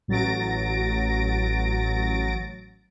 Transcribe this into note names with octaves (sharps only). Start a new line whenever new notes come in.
A1 F#3 A6 A#6 D7